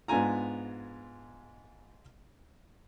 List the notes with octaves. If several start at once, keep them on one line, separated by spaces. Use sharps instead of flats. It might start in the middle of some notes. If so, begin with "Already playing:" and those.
G#2 B3 D4 F4 G#5 A#5